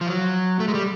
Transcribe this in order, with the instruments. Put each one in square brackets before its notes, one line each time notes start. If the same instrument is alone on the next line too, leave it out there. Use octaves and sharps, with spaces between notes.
[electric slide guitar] F3
F#3
A3
G#3
G3